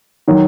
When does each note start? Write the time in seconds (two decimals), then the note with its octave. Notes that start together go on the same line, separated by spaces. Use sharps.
0.27 D#3 F#3